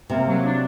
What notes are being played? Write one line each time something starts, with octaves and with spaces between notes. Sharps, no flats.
C3 A#3
F#3
D4